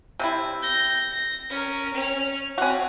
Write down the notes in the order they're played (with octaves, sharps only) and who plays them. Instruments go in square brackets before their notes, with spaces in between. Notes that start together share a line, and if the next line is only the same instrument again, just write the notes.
[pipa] C3 C4 E4
[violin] G6 A#6
A#6
C#4 A#4
C#4 F7
[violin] C4 [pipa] C#4 F#4